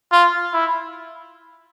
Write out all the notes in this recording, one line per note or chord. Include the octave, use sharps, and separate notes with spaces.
F4
E4